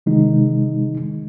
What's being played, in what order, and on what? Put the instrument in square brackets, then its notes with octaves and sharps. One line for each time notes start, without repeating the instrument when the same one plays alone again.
[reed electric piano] C3 D#3 G#3 D#4